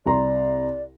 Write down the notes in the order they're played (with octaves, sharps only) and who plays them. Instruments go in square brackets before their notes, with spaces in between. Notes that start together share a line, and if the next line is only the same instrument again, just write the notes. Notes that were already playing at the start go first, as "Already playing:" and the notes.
[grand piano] C2 A#5 C6 [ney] D5